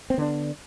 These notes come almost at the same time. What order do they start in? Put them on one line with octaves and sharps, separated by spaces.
C4 B3 D3 D4